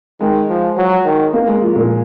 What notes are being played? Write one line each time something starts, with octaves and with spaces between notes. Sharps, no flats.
D#3 G#3
F3
F#3
D#3
A#3
G#3
F3
A#2